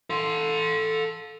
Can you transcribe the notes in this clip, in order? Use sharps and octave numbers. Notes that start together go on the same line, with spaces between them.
A4 C6